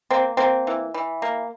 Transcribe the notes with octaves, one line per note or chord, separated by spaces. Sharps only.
A#3 C4
A#3 C4
E3
E3
A#3